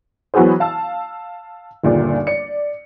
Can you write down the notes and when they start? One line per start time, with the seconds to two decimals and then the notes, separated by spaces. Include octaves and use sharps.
0.34 E3 F#3 B3 F#4 G#4 C5
0.60 F5 A5 E6
1.84 G1 D#2 A#2 G3 G#4 D5
2.27 D5 C#7